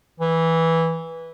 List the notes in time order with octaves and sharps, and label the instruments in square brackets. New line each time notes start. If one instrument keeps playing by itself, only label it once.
[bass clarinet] E3